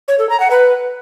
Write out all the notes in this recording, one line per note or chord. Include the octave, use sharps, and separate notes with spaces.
C#5
A4
A#5
F#5
B4